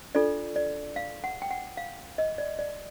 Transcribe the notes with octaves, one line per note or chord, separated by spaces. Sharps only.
D4 F4 A4 D5
D5
F5
F#5
G5
F#5
F5
D#5
D5
D5